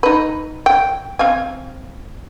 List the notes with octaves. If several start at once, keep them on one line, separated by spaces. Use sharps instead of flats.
D#4 B4
G5
C4 F5 G#5